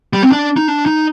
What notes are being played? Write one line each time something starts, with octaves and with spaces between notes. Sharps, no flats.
G3
C4
D4
D#4
D4
D#4